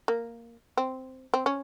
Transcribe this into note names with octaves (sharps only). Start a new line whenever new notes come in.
A#3
C4
C4
C#4